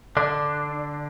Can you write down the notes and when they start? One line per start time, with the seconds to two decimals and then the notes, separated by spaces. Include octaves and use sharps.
0.17 D3 D4